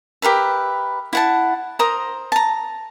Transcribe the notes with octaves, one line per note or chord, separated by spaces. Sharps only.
G4 A#4 B4 E5
E4 F#5 A5
A#4 C5 A#5 D#6
A5 A#5